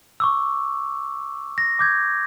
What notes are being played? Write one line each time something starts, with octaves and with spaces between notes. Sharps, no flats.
C#6 D6 E6
A#6
D6 G6 G#6